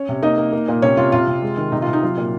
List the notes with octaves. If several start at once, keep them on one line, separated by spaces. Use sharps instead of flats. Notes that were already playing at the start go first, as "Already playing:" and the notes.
Already playing: C#4 C#5
C3
A#3 D#4 D#5
A#3
A#3
A#2
C3 C#4 C#5
C3 F4
C3 F4
C3
G#3
D#3
C3 D#4
F4
C3
D#4
F#3 F4
A#2